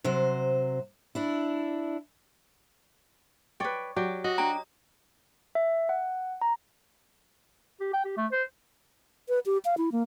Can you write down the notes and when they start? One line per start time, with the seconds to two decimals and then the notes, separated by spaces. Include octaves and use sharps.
0.04 C3 F#3 C5
1.15 D4 E4
3.60 B4 C#5 D5 G5
3.96 F#3 G4 D5
4.24 F#4 D#5
4.38 D4 G5 A#5
5.55 E5
5.89 F#5
6.41 A#5
7.80 G4
7.93 G5
8.04 G4
8.17 A3
8.32 C5
9.29 B4
9.46 G4
9.65 F5
9.78 E4
9.92 A#3